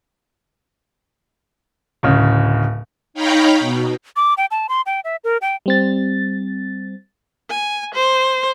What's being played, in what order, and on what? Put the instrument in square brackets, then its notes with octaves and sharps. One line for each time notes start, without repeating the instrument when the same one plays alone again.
[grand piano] D1 C#3
[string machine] D#4 C#5 F5 G5 A#5 B5
B2
[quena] D6
G5
A5
C6
G5
E5
A#4
G5
[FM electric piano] G3 C4 A6
[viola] G#5
C5